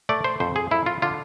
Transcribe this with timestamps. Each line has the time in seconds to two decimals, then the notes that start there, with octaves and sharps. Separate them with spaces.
0.09 A3 D5
0.24 C5
0.40 F2 C5
0.56 G#4
0.71 F2 E4
0.86 F4
1.02 D3 F4